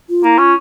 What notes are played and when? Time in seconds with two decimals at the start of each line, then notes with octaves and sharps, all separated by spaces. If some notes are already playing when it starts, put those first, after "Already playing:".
0.09 F4
0.24 A#3 E4
0.38 C#4 F4